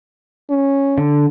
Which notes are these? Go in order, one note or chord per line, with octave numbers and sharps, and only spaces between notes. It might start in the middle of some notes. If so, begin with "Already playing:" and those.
C#4
D3